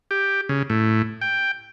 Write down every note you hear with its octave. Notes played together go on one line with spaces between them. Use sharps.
G4
C#3
A2
G5